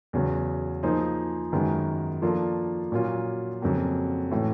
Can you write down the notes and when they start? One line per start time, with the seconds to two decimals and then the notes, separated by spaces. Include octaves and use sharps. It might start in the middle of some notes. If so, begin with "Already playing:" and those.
0.13 E2 C#3 F#3 B3
0.83 F3 A#3 D#4 G#4 C5
1.52 F#2 D#3 G#3 B3
2.22 F3 A#3 D4 F4 A4
2.92 A#2 F#3 A#3 C#4 F4
3.62 F2 C#3 F#3 A#3
4.31 A2 E3 A3 C#4